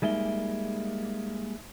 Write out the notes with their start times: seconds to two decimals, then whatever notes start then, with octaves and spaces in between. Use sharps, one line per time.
0.02 G3 G#3 A#3 D#4 E5 G7